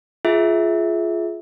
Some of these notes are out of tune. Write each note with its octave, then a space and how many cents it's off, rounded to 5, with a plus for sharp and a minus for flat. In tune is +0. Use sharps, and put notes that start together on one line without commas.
F4 -15 G#4 +15 E5 -15